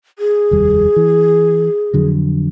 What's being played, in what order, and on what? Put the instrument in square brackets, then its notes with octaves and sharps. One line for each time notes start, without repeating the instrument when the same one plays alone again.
[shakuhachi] G#4
[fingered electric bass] F1 D#2 G3
E3
F2 D3 F#3